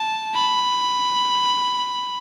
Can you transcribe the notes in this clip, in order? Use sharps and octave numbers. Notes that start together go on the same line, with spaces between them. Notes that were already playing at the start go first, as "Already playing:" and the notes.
Already playing: A5
B5